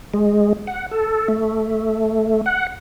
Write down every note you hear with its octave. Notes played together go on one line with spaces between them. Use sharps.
G#3
F#5
A4
A3
F#5